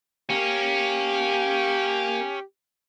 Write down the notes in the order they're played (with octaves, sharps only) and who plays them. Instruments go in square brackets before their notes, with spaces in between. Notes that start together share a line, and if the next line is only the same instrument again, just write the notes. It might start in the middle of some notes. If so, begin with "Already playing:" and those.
[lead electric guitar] A#3 A#4 [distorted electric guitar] C#4 [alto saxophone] G4